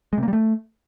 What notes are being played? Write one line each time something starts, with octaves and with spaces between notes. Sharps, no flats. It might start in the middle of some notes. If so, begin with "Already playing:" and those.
G#3
C3
A#3
G3
A3